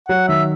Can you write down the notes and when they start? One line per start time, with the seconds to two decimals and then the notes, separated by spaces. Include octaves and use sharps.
0.08 F#3 F#5
0.28 D#3 E5